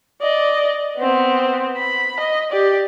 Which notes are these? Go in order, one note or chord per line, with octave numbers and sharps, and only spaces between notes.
D5 D#5
B3 C4
B5
D#5
G4 D5